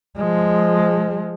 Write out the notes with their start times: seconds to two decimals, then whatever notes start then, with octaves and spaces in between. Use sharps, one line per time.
0.16 F3 G#3